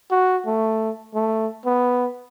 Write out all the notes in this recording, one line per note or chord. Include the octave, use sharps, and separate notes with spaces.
F#4
A3
A3
B3